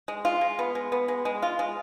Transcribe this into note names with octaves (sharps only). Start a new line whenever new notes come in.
G#3
F4
G#3
B3
G#3
B3
G#3
G#3
F4
G#3